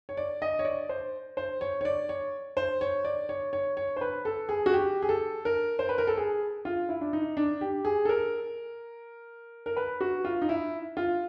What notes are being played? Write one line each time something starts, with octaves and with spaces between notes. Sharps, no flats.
C#5
D5
D#5
C#5
D5
C5
C5
C#5
C#5
D5
C#5
C5
C#5
D5
C#5
C#5
C#5
C5
B4
A4
G#4
F#4
G4
G#4
A4
A#4
C5
B4
A#4
A4
G#4
F4
E4
D4
D#4
D4
G4
G#4
A4
A#4
A#4
B4
F#4
F4
D#4
E4
F4